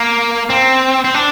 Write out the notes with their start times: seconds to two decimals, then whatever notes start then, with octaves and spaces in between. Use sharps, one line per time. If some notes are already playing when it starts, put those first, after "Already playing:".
Already playing: A#3
0.50 C4
1.04 C4
1.14 D4